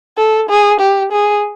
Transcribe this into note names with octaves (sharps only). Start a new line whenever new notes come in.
A4
G#4
G4
G#4